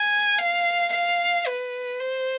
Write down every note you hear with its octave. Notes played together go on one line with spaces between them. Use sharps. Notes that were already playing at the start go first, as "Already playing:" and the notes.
Already playing: G#5
F5
F5
B4
C5